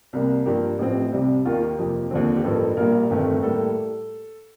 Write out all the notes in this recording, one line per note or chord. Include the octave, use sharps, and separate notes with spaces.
C2 C3 G3 A#3
G2 F3 A#3 G4
A1 A2 F3 C4
C2 C3 G3
D#2 D#3 A#3 F4
G4
F2 C3 F3 A#3
D#2 D3 F3 C4
G4
A1 G2 F3 A#3 A4
A#1 A#2 G3 A#4
G1 F2 D#3 A3
A2 G3 A#3 A4